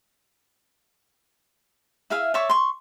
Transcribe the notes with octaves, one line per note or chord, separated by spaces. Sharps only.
E4 G#4 E5 F5
C#5 D5 E5 C#6
C6 C#6